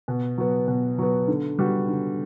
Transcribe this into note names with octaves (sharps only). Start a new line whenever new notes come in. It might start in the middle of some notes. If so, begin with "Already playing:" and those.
B2
F#3 B3
B2
F#3 B3
D3
G3 B3 F#4
D3